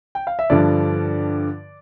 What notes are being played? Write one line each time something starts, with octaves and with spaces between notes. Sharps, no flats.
G5
F5
E5
G2 D3 F3 D5